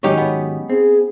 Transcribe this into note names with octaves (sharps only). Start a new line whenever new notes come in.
G#2 D#3 F#3 C#4 D#4 G4
B3
C4 G#4